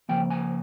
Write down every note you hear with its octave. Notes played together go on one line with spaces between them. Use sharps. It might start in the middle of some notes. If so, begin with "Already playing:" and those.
C#3 F3 A#3 G5
G#5